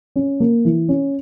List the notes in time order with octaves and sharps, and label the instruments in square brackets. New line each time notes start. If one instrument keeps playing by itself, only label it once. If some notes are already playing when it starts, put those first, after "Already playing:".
[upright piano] C#4
A#3
E3
C#4